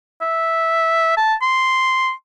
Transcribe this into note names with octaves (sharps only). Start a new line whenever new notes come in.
E5
A5
C6